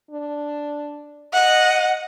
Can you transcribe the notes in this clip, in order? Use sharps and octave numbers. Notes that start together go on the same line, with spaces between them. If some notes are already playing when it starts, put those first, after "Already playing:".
D4
D#5 F#5